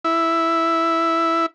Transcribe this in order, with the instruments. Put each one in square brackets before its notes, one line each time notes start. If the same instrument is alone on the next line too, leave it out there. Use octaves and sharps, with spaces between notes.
[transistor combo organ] E4